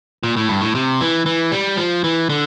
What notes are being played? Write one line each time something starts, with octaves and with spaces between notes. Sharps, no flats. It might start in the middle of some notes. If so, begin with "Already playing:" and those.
A#2
A2
G2
A2
C3
E3
E3
G3
F3
E3
D3